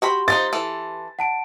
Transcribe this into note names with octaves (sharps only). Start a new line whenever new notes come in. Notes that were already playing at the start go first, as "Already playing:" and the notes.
F#4 G4 G5 B5 C6
D#4 F4 C5 A6
E3 A4
F#5 A5 D7